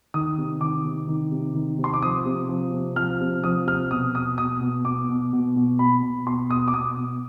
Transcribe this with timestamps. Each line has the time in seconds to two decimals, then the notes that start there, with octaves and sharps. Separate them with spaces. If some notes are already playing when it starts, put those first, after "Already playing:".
0.14 D#3 D#6
0.38 C3
0.61 D#3 D6
0.85 C3
1.08 D#3
1.32 C3
1.55 D#3
1.78 C3
1.84 C6
1.94 D6
2.02 F3 D#6
2.25 C3
2.49 F3
2.73 C3
2.96 F3 F6
3.21 C3
3.44 F3 D#6
3.67 C3 F6
3.91 B2 D#6
4.15 B2 D#6
4.38 B2 D#6
4.61 B2
4.85 B2 D6
5.09 B2
5.33 B2
5.56 B2
5.79 B2 B5
6.02 B2
6.27 B2 C6
6.49 B2 D#6
6.68 D6
6.73 B2 D#6
6.97 B2